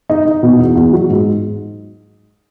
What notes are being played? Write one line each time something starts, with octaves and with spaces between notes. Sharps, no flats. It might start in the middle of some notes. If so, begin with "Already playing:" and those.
D#4
D#4
B2
E2
E2
F#3
G#2